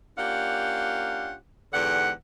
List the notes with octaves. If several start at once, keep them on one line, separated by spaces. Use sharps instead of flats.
A#3 C#4 D4 F4 G4 F#5
E2 G#2 D3 G4 F#5